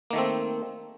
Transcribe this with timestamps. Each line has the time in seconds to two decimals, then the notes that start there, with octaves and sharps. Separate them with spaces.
0.11 A#3
0.13 D#3
0.16 A3
0.18 C4